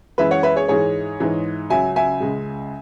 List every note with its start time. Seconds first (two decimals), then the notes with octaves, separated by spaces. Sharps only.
0.18 F#2 E3 G#3 B4 E5
0.31 C#5 F#5
0.43 B4 E5
0.56 G#4 C#5
0.68 G#2 E3 G#3 G#4 C#5
1.20 G#2 E3 G#3
1.70 C#2 C#3 F#3 E5 G#5
1.96 E5 G#5
2.20 C#2 C#3 G#3